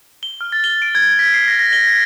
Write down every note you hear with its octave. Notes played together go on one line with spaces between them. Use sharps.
G7
F6
A6
G7
D7
G#6
B6
C7
A#6
A#6
G7
G#6